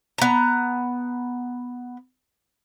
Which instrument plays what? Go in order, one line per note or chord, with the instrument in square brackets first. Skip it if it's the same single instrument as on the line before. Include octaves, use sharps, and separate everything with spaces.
[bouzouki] B3 A#5